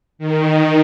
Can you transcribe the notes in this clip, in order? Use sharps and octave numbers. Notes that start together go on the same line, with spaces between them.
D#3